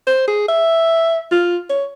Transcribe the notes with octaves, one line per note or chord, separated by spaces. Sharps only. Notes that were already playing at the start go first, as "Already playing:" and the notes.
C5
G#4
E5
F4
C#5